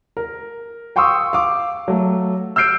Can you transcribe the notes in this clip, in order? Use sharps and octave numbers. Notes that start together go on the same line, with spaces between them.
A#4
F5 G5 C6 C#6 D#6 E6
F5 D6
F#3 A3
E6 F6 G6 C7 D7